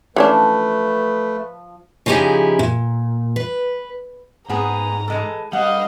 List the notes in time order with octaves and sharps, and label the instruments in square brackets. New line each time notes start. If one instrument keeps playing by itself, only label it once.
[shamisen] E3 C#4 D4 [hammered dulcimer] F3 [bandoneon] A3 [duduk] B4
[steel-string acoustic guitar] C#3 F3 D#4 E4 G4 G#4
A#2
B4
[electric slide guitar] G#2 [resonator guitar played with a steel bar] B3 C4 G#4 [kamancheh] A#5
[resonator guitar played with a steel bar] E3 G#3 A4
[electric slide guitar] G3 [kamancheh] D#5 F5 [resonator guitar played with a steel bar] F#5